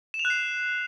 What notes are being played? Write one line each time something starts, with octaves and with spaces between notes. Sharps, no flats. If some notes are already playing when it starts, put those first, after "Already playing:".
E7
F7
F#6
C7
E7